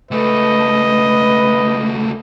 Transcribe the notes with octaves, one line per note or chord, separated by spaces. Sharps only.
C#2 A3 B4 D#5